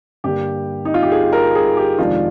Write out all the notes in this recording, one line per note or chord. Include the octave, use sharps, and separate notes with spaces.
G2 D3 G3 A#3 G4
D#4
F4
G4
G#4
A#4
G#4
G4
F2 C3 D#3 G#3 D4 F4